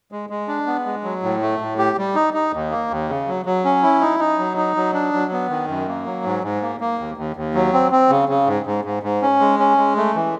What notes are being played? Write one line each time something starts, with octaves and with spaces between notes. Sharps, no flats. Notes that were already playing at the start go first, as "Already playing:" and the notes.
G#3
G#3
D4
B3
G#3
F#3
A2
A3
A2
G4
G3
D#4
D#4
D#2
A#3
D#2
C#3
F#3
F#3
C#4
E4
D#4
D#4
F#3
D#4
F#3
D4
F#3
B3
D#3
F#2
A#3
F#3
G#2
G#2
A#3
A#3
D#2
D#2
D#2
F#3
C4
C4
C#3
C#3
G#2
G#2
G#2
G#2
C#4
G#3
C#4
G#3
A3
E3